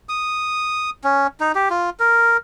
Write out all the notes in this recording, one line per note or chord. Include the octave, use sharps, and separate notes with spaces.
D#6
C#4
D#4
G4
F4
A#4